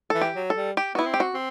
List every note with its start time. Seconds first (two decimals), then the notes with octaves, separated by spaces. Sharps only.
0.10 E3 A4
0.21 G4
0.36 F#3
0.50 A4
0.57 G3
0.77 G4
0.95 B3 E4 F#4
1.06 C4
1.14 G4
1.20 F#4
1.34 C4